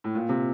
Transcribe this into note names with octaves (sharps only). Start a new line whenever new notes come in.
A2
A#2
C3